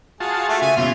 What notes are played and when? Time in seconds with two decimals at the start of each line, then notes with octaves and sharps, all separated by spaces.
0.20 F4 F#4 G#4 A5
0.49 A3 E5
0.62 C#3 G#5 C#6
0.77 B2 E3 F4